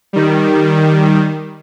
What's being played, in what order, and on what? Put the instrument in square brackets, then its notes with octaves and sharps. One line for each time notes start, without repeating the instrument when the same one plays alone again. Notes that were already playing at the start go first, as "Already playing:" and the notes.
[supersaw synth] D#3 G3